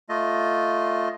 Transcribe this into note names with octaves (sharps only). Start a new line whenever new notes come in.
A3 F4 D#5